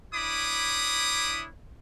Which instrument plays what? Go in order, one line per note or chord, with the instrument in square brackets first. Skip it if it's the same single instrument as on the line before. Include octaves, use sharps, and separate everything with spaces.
[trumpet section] D4 E4 C#5 B5 D6 D#6